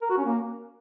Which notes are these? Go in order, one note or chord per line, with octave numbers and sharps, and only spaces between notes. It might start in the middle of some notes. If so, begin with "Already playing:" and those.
A#4
F#4
C#4
A#3